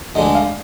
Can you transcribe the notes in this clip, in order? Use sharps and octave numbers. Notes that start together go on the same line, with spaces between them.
D2 D3 G#3 D4 D#5
F5